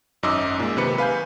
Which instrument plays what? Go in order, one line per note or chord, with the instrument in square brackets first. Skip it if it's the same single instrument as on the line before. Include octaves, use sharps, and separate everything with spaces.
[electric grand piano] G#1 F#2 D#4 D#5 D6 E6
A#2 G#3
C3 D#3 B4 C#7
B4 F5 G#5 B5 G6